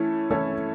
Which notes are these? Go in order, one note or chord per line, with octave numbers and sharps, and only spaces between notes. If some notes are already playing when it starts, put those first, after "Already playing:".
Already playing: E3 A3 C#4 E4 A4
E3 A3 C#4 E4 A4